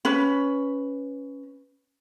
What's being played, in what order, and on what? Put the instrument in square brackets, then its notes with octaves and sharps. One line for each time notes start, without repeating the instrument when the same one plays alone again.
[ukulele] C#4 B4